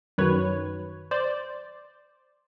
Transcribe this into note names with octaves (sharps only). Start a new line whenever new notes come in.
F#2 D#3 F#3 B4 C#5
C5 D5